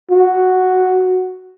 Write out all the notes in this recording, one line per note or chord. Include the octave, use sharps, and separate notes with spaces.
F#4